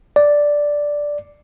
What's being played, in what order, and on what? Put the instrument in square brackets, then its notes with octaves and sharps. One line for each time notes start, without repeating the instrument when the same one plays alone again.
[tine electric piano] D5